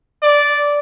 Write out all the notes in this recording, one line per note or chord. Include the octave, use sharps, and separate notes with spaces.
D5